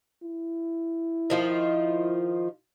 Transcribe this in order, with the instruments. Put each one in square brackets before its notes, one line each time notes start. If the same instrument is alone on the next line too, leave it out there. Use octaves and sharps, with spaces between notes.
[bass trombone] E4
[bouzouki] D#3 F3 F4